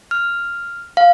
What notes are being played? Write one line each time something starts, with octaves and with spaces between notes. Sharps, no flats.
F6
F5